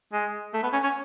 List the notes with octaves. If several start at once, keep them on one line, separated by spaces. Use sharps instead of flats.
G#3
A3
B3
C#4
C#4